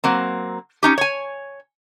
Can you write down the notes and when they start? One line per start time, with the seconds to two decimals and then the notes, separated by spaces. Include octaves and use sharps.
0.04 F#3 A#3 C4
0.83 C#4 D#4 G4
0.98 C#5 G#5